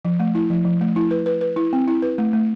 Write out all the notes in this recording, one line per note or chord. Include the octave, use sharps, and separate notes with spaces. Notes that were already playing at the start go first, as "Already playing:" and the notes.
F3
A3
E4
F3
F3
A3
E4
B4
B4
B4
E4
C4
E4
B4
A3
A3